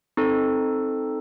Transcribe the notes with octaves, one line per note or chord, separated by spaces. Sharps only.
C4 D#4 A4